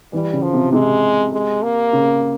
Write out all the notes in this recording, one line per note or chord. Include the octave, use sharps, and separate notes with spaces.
E3 G3
C#3
F3
C3
C3 G#3
G#3
A#3
C#3